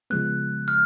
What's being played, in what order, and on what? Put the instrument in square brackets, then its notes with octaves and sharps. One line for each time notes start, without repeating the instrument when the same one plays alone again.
[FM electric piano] C#3 F3 G#3 B3 [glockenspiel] F#6
[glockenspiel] F6